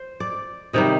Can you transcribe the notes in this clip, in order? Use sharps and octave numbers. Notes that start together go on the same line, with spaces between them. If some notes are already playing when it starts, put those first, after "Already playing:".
Already playing: C5
D5
C3 D#3 G3 D#5